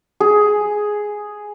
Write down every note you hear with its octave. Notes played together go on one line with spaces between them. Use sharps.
G#4